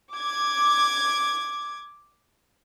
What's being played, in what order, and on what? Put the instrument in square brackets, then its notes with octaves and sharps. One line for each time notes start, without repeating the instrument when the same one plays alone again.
[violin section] D6 G#6